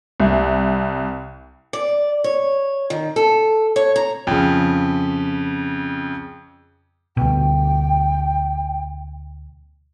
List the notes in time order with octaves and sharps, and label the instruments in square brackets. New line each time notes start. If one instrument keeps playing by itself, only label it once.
[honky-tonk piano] C2
[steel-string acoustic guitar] D5
C#5
D#3
A4
C#5
A#5
[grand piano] F2 C#3
[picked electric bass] D2 B2 [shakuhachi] G5